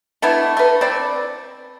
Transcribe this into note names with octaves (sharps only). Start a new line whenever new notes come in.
A3 B3 D4 E4
A3 B4
C4 B4 D5